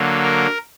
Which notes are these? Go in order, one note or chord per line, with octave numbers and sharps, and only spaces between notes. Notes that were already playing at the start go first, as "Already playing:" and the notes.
Already playing: D3 F#3 A#3
A#4